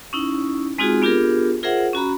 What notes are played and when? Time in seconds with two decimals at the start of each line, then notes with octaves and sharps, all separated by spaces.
0.13 C#4 D#4 E4
0.78 G#3 C4 D#4 F4 F#4 G#4
1.02 B3 D4 F4 G4 G#4 A#4
1.63 F4 G#4 A#4 C5 E5 F#5
1.93 C#4 F#4 A#5 B5